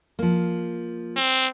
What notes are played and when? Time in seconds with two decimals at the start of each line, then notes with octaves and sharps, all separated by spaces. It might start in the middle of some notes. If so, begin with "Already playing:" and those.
0.19 F3 A#3
1.16 C4